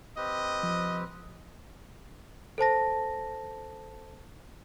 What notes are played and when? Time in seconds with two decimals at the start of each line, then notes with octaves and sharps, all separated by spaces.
0.17 C4 G4 B4 D#5
0.63 F3
2.58 A4 C5 A5 A#6